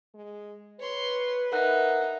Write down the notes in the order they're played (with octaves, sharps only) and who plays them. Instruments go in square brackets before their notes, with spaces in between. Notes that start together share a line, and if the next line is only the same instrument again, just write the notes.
[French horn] G#3
[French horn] B4 [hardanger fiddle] C#5 C6
[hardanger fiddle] D#4 E5 [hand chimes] A#4 F#5 F#6